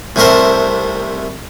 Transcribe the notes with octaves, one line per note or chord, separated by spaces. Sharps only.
C2 C3 A3 A4 A#4 C5